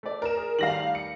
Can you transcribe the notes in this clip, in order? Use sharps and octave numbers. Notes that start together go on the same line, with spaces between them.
A3 D5
A#4 E7
G#4
D#3 G3 A3 F5 A#6 F#7
C#7